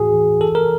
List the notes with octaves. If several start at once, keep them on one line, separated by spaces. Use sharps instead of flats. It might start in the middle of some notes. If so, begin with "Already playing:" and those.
Already playing: A2 E3 F#4 G#4
E3
E3 A4
A#4